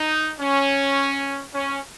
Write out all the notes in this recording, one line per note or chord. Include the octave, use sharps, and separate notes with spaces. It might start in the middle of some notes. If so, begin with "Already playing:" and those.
Already playing: D#4
C#4
C#4